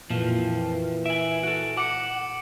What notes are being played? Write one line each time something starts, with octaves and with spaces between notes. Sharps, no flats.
F2 A#2 E3 F3
E5 G#5 D7 F#7
F#4 A4 D7
F#5 D6 C#7